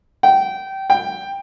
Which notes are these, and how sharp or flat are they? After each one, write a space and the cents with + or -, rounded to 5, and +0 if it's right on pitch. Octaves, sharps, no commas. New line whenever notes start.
G5 -20
G5 +10